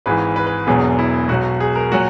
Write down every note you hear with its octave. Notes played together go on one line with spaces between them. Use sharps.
G#1 G#2 E3 B4
B4
B4
E1 E2 B2 F#3 G#4
E4
B1 B2 F#3 F#4
G#4
A#4
A#2 F#3 F#4